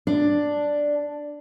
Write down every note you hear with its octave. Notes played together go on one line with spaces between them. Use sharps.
D4